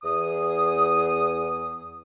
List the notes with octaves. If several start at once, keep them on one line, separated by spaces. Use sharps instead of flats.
E2 D#6